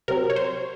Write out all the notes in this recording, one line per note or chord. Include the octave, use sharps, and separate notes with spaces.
C3 F#3 C4 A#4
C#5
C5